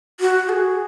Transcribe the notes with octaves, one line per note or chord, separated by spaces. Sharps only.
F#4
A4
G#4